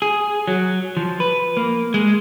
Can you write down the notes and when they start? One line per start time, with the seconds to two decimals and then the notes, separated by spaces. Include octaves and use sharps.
0.02 G#4
0.47 F#3
0.97 F3
1.20 B4
1.57 A#3
1.94 G#3